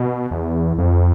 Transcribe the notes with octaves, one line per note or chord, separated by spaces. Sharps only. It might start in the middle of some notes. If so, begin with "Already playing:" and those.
Already playing: B2
E2
F2